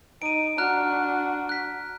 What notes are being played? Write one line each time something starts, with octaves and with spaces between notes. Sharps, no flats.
D#4 D7 D#7
D4 F#4 A#5 F6 F#6
F#6 B6